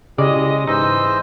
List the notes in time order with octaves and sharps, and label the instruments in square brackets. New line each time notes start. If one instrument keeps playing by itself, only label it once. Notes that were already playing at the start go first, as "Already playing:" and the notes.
[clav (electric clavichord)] C#3 D5 [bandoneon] G#3 [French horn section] E4 F#4 G4 [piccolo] D#5
[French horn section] G#2 [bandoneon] E3 C5 D#5 [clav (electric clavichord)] D#4 [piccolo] E6